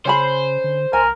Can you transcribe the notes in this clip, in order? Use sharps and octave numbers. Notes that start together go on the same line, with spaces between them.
C#3 C#4 G#4 C5 B5
D3
C2 A#4 G#5